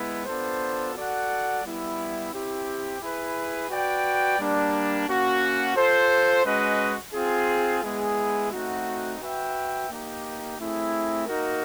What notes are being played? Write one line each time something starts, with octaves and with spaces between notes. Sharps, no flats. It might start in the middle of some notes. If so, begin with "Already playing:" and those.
Already playing: G#3 B3 E4
B3 D4 F4 A4 C5
F#4 A4 D5 F#5
G3 B3 E4
C4 E4 G4
E4 G#4 B4
F#4 B4 D5 G5
G3 A#3 D4
A#3 C#4 F#4
F4 A4 C5
G#3 C#4 F#4 B4 D#5
C4 F4 G#4
G#3 B3 E4 G#4
A3 C4 D#4 F#4
F#4 B4 E5 G5
A#3 D#4 G4
A3 C4 E4 G#4
A#3 D#4 F#4 A#4